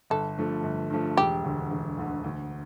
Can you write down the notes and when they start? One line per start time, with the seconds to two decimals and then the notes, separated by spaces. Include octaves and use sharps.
0.10 G1 A4
0.37 G2 F3 A3
0.63 G1
0.90 G2 F3 A3
1.17 E1 G4
1.44 D2 D3
1.70 E1
1.97 D2 D3
2.24 D2